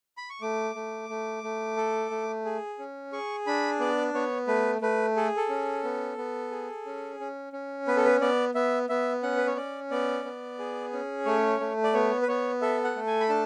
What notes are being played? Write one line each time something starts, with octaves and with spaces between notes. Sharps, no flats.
B5
C#6
A3 D6
A3
A3
A3
A4
A3
G#4
C#4
G#4 C#6
D4 B5
B3 D5
B3 C#5
A3 B4
A3 B4
G#4 A4
A4
C#4
B3
B3
G#4
C#4
C#4
C#4
B3 B4
A4
B4
B3 D5
B3 E5
B3 E5
C#4 F#5
B4
C#5
C#4 D5
B3 D5
B3
G#4
C#4
A3 C#5
A3
D5
B3 C#5
B4
B3 C#5
A4 E5
F#5
A3
G#5
B5
D4 A5